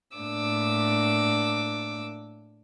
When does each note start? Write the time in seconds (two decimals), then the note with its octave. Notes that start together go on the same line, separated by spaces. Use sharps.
0.16 A2 A#3 D4 D6 E6